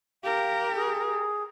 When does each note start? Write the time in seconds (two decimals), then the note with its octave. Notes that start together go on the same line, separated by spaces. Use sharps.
0.23 G4 A#4 F5
0.74 G#4